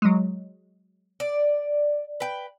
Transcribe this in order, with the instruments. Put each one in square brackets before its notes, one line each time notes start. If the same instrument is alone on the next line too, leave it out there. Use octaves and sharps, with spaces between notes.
[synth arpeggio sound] F#3 G#3
[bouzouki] D5
B4 G5